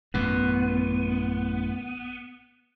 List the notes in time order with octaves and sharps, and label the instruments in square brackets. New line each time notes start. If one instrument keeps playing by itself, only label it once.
[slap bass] A1 F#2 A#2 [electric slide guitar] B3